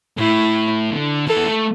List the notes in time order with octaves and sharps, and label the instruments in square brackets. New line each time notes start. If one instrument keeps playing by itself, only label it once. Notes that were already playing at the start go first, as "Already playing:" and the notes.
[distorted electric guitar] A2 [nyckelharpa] E4
[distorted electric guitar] D3
[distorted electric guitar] E3 [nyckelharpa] A4
[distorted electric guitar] B3
A3